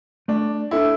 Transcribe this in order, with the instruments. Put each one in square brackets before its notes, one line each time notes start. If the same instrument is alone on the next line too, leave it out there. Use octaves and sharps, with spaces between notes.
[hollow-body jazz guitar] A3 [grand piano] D4
[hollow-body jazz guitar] D4 A4 E5 [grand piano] E4